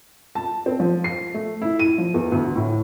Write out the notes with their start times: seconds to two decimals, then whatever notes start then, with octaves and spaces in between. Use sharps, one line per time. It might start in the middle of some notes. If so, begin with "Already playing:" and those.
0.35 A5
0.66 C4
0.80 F3
1.04 C7
1.34 A3
1.62 E4
1.79 D#7
1.98 F3
2.14 E2
2.32 D2
2.55 A2